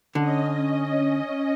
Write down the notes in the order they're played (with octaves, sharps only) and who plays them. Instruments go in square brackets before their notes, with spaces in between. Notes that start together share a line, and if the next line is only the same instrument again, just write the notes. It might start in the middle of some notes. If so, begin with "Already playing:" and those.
[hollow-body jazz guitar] D3 [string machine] C#4 D#5